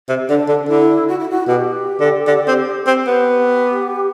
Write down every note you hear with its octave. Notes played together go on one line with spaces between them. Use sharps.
C3
D3 D4
D3
D3 E4
F#4
E4
F#4
B2 G4
D3
D3
C4
C4
B3 G4